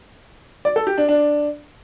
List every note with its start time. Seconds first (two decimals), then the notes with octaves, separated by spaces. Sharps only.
0.65 D5
0.76 A4
0.87 G4
0.98 D4
1.09 D4